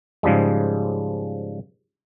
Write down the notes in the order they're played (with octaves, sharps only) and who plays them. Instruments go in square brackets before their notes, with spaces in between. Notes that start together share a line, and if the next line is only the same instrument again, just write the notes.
[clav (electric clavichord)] G#2 C#3 F3 G3 G#3